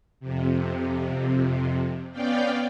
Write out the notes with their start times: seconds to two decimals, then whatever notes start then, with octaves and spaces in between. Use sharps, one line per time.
0.20 F2 C3
2.12 B3 C#4 D5 F5 G5